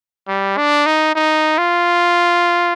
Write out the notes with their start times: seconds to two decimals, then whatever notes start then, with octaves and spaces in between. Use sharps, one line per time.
0.28 G3
0.58 D4
0.86 D#4
1.15 D#4
1.59 F4